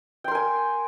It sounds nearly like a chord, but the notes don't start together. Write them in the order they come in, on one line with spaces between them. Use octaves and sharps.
G5 C6 A#4 G#5